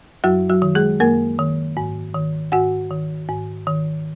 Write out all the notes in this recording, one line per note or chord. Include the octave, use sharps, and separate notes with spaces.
F#2 F#3 F#4
F#3 F#4
D#3
G#3 G#4
F#2 A#3 A#4
D#3
G#2
D#3
G#2 F#4 F#5
D#3
G#2
D#3